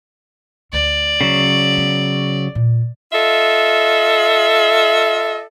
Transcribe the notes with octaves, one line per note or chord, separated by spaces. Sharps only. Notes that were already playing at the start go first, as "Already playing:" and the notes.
D2 D5
C#3 F#3
B3
A#2
F4 A4 D#5 E5